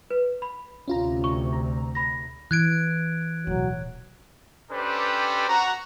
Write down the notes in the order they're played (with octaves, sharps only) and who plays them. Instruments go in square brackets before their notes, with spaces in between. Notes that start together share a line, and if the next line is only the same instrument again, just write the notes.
[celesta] B4
B5
[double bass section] D2 C3 [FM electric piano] C#4 F4 A#5
[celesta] C#6
[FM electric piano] A#5
[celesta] B5 A#6
[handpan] E3 [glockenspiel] F#6 G#6 D7
[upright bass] D1 B1 [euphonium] F#3
[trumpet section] C#4 D4 G4 A4 B4 C5
F#4 A#5